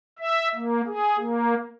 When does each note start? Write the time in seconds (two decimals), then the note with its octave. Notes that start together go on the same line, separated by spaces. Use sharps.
0.19 E5
0.55 A#3
0.87 G#4
1.19 A#3